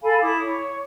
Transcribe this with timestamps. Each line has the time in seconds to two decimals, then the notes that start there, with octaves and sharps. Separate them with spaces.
0.02 A4 F5 G#5 B5
0.20 E4 D6 D#6
0.39 C#5